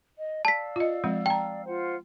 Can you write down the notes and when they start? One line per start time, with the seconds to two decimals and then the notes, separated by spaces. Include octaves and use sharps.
0.17 D#5
0.45 D5 F5 A5 E6 B6
0.76 F4 D#5
1.04 F3 G#3 C4
1.26 G5 A5 A#5
1.66 F4 C5 F#5